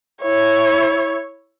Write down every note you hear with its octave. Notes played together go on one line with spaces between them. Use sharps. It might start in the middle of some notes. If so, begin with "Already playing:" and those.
E4 C#5